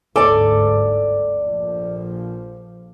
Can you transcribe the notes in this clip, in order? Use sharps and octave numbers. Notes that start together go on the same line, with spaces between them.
G1 D2 G#2 A4 D5 G#5 D6
A#1 F3